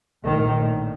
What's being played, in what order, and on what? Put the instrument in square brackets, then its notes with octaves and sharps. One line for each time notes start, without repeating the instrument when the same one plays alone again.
[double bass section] A#1 A2 D#3